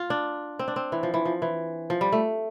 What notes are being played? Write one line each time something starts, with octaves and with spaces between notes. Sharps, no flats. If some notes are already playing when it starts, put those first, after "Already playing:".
Already playing: F4
D4
C4
D4
C4
E3
F3
E3
F3
E3
F3
G3
A3